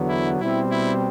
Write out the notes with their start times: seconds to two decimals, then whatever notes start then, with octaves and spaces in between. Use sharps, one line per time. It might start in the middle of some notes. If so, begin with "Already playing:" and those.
Already playing: E2 D3 F#3 B3
0.09 E4
0.40 B2 G3 C4 E4
0.71 E4